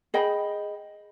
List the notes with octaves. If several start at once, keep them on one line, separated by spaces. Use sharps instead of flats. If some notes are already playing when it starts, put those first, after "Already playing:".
G#4 D#5 G5 B5